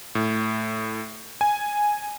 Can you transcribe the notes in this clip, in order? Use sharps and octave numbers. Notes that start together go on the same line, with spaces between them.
A2
G#5